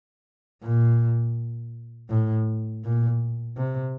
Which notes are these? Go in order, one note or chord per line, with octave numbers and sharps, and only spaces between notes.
A#2
A2
A#2
C3